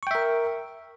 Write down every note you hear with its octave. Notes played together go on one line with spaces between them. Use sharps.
A#4 E5 G5 C#6